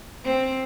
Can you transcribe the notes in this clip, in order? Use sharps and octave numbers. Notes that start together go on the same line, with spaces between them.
C4